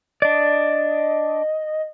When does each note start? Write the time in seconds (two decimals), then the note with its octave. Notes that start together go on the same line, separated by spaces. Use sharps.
0.22 D4 D5 D#5